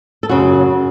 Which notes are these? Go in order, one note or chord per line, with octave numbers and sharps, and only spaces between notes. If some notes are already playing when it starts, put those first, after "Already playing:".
A4
F#2 C#3 F#3 F#4